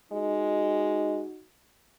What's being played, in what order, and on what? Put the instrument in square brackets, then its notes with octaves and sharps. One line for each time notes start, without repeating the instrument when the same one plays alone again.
[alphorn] G#3 [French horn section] D#4 F#4